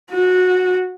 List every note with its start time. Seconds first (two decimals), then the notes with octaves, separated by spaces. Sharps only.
0.11 F#4